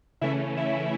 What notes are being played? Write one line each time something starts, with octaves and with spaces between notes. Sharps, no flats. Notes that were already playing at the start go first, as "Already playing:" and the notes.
C#3 E3 A3 C#4 E4 E5
E4 E5